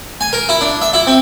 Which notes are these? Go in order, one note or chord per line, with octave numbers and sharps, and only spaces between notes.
G#5
A#4
E4
D4
E5
E4
C4